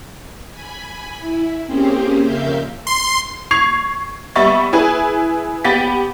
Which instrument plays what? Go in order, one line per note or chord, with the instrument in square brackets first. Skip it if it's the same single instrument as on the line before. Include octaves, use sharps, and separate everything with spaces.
[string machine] G#5 B5
E4
A#3 C4 C#4 G4 G#4 C5
F2 C#3 A#4 E5 F5 G6
[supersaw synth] C6
[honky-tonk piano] C#6 G#6 C7 F7
G3 B3 E5 B5 C#6 A6
E4 G#4 B4
B3 G4 A6 B6